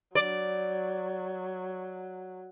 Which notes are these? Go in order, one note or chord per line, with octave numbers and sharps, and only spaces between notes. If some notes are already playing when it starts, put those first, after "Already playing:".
F#3 D5